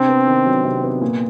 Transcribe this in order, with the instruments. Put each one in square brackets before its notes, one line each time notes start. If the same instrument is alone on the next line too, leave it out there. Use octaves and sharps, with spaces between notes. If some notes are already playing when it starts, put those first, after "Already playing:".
Already playing: [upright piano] C3 D4 [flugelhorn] C4
[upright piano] B3
D#3
F#3
C3
B3
A#2